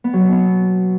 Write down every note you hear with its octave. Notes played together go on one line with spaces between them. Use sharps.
B3
F#3
B2
B3